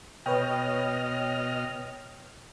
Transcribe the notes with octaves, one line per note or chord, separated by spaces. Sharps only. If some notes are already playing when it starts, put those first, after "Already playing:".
B2 B4 C#5 D#5 G5 F6